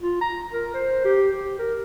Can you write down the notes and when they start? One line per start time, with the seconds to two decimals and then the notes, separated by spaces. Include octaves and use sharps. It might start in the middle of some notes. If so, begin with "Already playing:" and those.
0.01 F4
0.21 A#5
0.53 A#4
0.74 C5
1.05 G4
1.31 G4
1.59 A#4